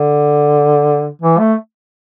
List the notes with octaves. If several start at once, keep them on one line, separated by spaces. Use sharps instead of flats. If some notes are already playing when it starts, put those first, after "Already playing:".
Already playing: D3
E3
A3